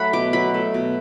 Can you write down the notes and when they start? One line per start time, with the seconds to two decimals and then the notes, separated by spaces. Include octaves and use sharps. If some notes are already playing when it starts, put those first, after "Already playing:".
Already playing: F#3 A3 F#5 B5
0.13 B2 D6
0.33 F#3 B5
0.54 A3
0.74 B2